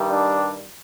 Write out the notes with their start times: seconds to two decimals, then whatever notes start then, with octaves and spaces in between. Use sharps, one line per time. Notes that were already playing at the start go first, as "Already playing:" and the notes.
Already playing: G2 D#3 G3
0.10 D4